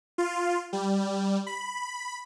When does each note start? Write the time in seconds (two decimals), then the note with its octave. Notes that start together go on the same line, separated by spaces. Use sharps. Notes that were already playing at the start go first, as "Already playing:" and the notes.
0.18 F4
0.73 G3
1.47 B5